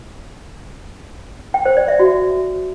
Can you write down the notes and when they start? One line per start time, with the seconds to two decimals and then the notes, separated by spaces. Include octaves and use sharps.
1.54 G5
1.65 C5
1.77 D5
1.88 E5
1.99 F#4